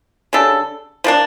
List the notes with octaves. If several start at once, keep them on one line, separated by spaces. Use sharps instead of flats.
C#3 G3 D4 A4
F3 A#3 D4